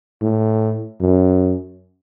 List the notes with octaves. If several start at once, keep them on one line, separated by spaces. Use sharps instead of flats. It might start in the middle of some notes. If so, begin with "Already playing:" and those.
A2
F#2